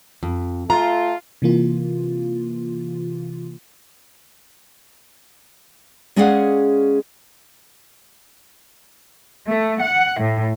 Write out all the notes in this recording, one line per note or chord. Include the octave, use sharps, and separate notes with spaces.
F2
A3 F4 A#5
C3 E3 A#3 F4
G#3 C#4 G#4 D5 F5 F#5
A3
F#5
A2